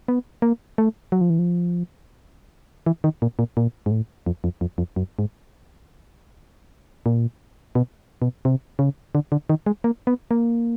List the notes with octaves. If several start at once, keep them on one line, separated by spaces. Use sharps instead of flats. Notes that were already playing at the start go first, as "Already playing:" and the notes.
B3
A#3
A3
F#3
F3
E3
F3
E3
D#3
A#2
A#2
A#2
G#2
A2
F2
F2
F2
F2
F#2
G#2
A#2
B2
B2
C3
C#3
D3
D3
D#3
G#3
A#3
B3
A#3